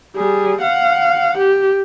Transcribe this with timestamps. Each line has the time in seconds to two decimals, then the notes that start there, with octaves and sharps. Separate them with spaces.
0.16 G3 G#4
0.62 F5 F#5
1.38 G4